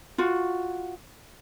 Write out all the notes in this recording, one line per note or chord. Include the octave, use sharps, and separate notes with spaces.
F4 F#4